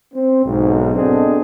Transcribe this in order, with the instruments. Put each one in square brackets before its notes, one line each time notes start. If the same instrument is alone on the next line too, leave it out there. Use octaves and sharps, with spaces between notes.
[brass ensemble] C4
B1 G#2
B3 C4 D4 G#4 A4 D#5